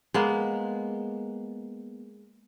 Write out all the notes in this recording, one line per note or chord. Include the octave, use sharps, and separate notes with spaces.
G#3 A#3 B3